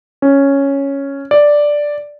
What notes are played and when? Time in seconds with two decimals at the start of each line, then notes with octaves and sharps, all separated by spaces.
0.22 C#4
1.31 D5